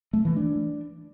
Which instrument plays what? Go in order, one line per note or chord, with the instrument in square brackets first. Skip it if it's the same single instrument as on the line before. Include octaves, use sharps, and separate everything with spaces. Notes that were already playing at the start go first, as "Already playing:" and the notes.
[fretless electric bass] A3
E3
D4